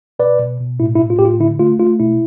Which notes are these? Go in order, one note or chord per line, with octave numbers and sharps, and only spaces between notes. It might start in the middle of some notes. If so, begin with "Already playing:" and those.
B2 B4 D5
B2
B2
A2 E4
E4
A2
F4
A2 G4
F4
D3 E4
A3 F4
A3 F4
B2 E4